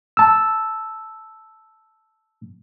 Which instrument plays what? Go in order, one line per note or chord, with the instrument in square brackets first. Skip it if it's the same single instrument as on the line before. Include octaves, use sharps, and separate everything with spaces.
[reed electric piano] A5 E6